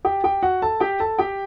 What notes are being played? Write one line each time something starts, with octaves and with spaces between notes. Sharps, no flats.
G4 G5
G4 G5
F#4 F#5
A4 A5
G4 G5
A4 A5
G4 G5